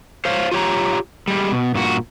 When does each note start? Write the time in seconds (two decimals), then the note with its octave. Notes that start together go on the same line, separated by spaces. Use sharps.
0.25 C5 C#5 F5
0.52 F4 G4 C#5 A#5
1.28 G3 G#3
1.52 B2
1.74 G2 A#2 F#4